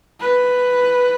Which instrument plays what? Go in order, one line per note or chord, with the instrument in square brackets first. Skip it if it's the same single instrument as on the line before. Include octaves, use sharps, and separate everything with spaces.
[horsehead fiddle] B4